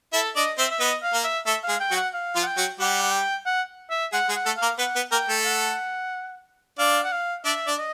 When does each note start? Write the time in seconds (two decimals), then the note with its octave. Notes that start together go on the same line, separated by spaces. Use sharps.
0.13 E4 A4 E5
0.36 D4 D5 D#5
0.58 C4 C5 E5
0.71 E5
0.80 B3 B4 D#5
1.03 F5
1.13 A#3 A#4
1.24 E5
1.46 A3 A4 E5
1.63 F5
1.68 G#3 G#4
1.80 G5
1.91 F#3 F#4
1.96 F#5
2.13 F5
2.36 F3 F4
2.43 F#5
2.47 G5
2.57 F#3 F#4
2.80 G3 G4 F#5
3.02 F#5
3.12 G5
3.46 F#5
3.90 E5
4.12 G#3 G#4 F#5
4.29 G#3 G#4
4.35 F#5
4.46 A3 A4
4.57 F5
4.62 A#3 A#4
4.79 B3 B4 F#5
4.96 B3 B4
5.12 A#3 A#4 G5
5.29 A3 A4
5.45 F#5
6.79 D4 D5 F5
7.04 F#5
7.12 F5
7.45 D4 D5 E5
7.67 D4 D5
7.78 D#5